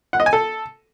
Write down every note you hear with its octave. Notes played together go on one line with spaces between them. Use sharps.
F#5
D#5
G#5
A4